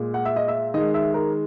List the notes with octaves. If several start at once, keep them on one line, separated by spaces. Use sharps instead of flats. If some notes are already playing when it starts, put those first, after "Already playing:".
Already playing: A#2 G#3
F#5
E5
D#5
E5
D#3 G#3 D#5
E5
A#4